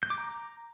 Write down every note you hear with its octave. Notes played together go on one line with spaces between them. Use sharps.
G6
D6
A#5